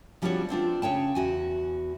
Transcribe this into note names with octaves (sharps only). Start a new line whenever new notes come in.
F3 G3 C4 D4 F#4 C#5
B3 C4 D4 F4
C#3 C#5 G5 A5
E2 F#4 G#5